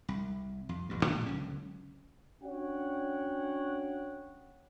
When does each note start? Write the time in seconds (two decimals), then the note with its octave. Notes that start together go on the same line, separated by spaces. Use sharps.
0.09 C2
0.69 F2
0.89 A1 D2 G2
1.03 A#2 D3 D#3 F3
1.26 C#2 D3 F#3 C#4
2.44 C#4 D4 F#4 C#5 F#5 G5